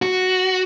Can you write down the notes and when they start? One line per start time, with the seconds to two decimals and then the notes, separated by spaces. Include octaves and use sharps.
0.02 F#4